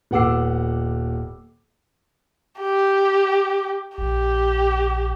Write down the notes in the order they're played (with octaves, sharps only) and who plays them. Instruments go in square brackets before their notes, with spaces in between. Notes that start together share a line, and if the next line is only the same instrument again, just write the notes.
[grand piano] D#1 B3 F#5 D6 E6 C7
[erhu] G4
[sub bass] A#1 [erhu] G4